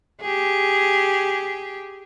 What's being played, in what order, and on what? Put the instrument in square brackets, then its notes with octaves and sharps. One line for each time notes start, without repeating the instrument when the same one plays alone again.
[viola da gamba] G4 G#4